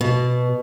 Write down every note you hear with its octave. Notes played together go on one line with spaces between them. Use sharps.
B2